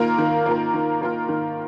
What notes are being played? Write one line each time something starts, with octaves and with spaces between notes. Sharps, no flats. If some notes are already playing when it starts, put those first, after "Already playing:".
Already playing: D#3 A#3 F4 A#4
D#3
A#3 F4 A#4
D#3
A#3 F4 A#4
D#3